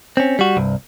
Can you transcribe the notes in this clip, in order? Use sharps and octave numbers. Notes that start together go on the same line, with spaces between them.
C4 C#4
G3 F#4
C2 G2